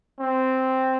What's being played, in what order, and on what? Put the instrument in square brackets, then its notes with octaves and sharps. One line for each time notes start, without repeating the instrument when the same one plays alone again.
[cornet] C4